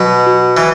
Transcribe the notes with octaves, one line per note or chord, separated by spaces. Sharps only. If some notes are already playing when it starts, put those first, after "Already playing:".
Already playing: B2 F#3
F#4
E3